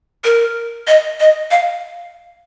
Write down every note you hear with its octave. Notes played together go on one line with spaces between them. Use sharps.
A#4
D#5
D#5
F5